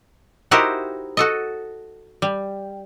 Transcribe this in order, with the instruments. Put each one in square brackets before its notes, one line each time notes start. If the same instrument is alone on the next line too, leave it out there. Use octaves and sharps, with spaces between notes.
[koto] D#4 E4 F#4 G4 A#4 C5
F#4 A4 D#5
G3